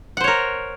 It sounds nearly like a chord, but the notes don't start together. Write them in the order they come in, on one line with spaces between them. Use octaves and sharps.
F#5 C5 C#5 A#4